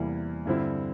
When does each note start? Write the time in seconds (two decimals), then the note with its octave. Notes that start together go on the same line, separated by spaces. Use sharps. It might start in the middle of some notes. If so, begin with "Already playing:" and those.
Already playing: E2 C3 G3 A#3 E4
0.46 G2 D3 G3 C4 E4